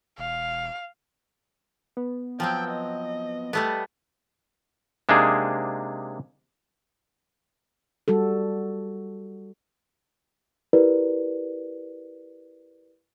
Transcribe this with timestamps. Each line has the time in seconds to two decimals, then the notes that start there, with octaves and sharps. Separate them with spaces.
0.18 E1 F5
1.97 B3
2.40 F3 F#3 C4 G5
2.71 D#5
3.53 G3 A3 B3
5.09 C3 G#3 A#3 D4 D#4 G#4
8.08 G3 F#4 A4
10.73 E4 G4 A#4 B4 D5